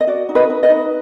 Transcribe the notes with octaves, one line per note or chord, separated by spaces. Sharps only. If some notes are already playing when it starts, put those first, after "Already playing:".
D#5
F#4 D5
D#4
B4 D#5
D#4
B4 D#5
D#4